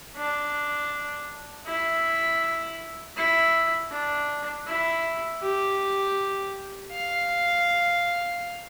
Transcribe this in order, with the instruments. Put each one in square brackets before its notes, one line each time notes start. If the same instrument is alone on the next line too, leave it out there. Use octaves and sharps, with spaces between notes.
[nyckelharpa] D4
E4
E4
D4
E4
G4
F5